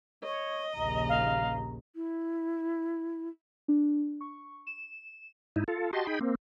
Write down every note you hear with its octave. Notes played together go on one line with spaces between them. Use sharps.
C#5 D#5
A#1 D#2 C#3 A#5
F5
E4
D4
C#6
E7
G#2 D#4 E4
F4 A4
F#4 G4 D#5 A5 C6
D#4 G#4 G5 B5
A#3 C4